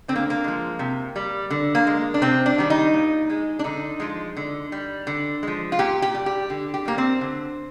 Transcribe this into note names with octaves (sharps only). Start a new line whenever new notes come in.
D3 C4
A#3
A#3
F3 G#3
C3
G3
D3
A#3
G#3
D4
C3 C4
D4
D#3 G3
D#4
A#2
G#3
D4
D3 D#4
F3 G#3
D3
G3
D3
F3 G#3
F4
A#2 G4
G4
G3
G4
D3
G4
G3 A#3
C4
D3